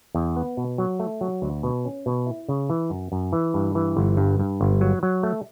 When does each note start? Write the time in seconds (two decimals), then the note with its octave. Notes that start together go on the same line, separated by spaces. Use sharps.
0.15 E2
0.36 B3
0.57 B2
0.78 F#3
1.00 A3
1.21 F#3
1.42 D2
1.63 B2
1.85 C#4
2.06 B2
2.27 E4
2.49 C#3
2.70 E3
2.90 F#2
3.12 F#2
3.33 E3
3.54 G2
3.75 E3
3.97 G1
4.17 G2
4.39 G2
4.61 G1
4.81 F#3
5.03 F#3
5.23 A3